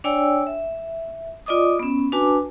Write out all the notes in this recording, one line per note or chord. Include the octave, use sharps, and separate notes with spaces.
D4 C#5 D5 G5 G#5 E6
E5
F4 D5 D#5 D6 D#6
B3 C#4
D4 F#4 B4 G#5 A5 D6